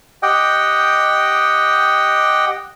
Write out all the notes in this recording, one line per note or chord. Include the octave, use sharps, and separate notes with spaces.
G4 D#5 F#5 G5